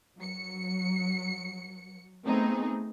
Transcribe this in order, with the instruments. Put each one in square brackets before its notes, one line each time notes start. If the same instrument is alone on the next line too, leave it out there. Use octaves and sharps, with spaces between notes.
[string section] F#3 C#7
A3 B3 C4 D#4 G#4